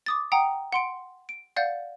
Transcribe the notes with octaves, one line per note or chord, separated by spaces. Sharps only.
D6 D#6 A6
F#5 G5 A#5 D#6
F#5 C6 D7
D7
D5 F5 F#5 G6 A6